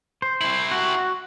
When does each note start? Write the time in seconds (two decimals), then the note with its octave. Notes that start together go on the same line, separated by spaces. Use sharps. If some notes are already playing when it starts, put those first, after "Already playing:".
0.22 C5
0.41 C4 E4
0.71 F#4